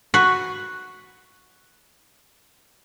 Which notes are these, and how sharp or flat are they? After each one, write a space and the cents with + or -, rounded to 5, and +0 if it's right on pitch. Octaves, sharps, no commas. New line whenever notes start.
F#4 +0 B4 +0